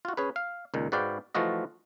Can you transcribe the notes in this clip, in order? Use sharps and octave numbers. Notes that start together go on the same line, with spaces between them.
F4 F#4
C#4 G#4 B4
F5
C#2 A#2 D#3
G#2 F#4 B4 D5 F5 G5
E3 F3 A3 F4 F#4 D#5